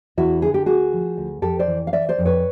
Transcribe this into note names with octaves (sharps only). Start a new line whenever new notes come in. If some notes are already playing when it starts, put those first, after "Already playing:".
E2 E4 F#4
D3 G#4
G4
D2 F#4 G#4
F3
D2
F2 G4 A4
C5 D5
E3
F5
E3 D5 E5
C5 D5
F2
B4 C#5